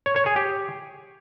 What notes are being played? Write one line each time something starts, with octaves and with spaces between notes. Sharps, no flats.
C#5
C#5
G#4
G4